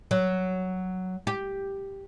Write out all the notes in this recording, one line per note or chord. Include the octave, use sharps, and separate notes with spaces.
F#3
G4